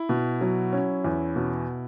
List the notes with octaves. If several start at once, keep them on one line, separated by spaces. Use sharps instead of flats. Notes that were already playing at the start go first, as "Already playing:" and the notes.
Already playing: E4
B2
F#3
C#4
E2
B2